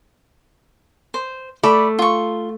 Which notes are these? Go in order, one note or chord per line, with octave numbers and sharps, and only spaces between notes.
C5
A3 D5 B5
F4 C#6